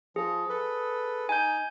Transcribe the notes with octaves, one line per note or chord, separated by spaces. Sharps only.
F3 G#4
A4 B4
D#4 G#5 G6